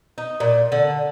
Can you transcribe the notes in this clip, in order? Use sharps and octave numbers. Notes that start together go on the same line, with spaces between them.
D#4
A#2
D3